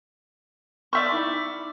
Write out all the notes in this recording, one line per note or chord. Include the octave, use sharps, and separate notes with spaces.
D5 E5 C#6 F6 G6
D#4 E4 B5